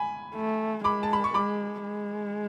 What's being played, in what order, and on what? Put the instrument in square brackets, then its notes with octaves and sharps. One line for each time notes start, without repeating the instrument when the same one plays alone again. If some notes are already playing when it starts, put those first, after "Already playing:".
Already playing: [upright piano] G#5 B5
[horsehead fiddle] A3
[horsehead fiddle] G#3 [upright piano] B5 D6
[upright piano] A5
B5
C#6
[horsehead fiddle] G#3 [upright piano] B5 D6
[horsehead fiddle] G#3